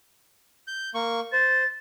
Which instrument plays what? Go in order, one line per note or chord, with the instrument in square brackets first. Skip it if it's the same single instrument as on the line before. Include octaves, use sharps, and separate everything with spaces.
[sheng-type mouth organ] G6
A#3 C#6
[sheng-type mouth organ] C5 [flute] A6